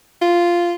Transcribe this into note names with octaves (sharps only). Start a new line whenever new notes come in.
F4